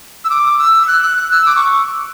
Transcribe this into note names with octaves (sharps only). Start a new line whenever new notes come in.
E6
D6
E6
E6
F#6
F#6
E6
D6
C#6